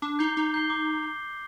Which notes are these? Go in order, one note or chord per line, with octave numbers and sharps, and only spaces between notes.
D4 D6
D#4 G6 C7 G7
D#4 D6
G6 C7 G7
D6